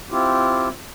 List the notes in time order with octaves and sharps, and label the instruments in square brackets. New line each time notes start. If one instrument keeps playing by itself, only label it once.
[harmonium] C4 E4 F4 G4